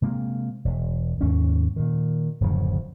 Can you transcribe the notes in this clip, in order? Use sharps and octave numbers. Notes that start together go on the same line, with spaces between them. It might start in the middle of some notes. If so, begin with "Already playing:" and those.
C3 G#3 A#3
E1
D#2 G#2 C#4
A#2 D#3
D1 F#2 C#3 F3